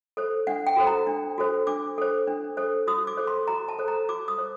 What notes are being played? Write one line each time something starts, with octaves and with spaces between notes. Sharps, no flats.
A4 C5
D4 F#5
G5
F#4 A4 C5
A#5
D4
F#4 A4 C5
D4 D6
A4 C5
D4
A4 C5
F#4 D#6
D6
A4 C5
C6
F#4 A#5
A5
A4 C5
A#5
F#4 D6
D#6
C5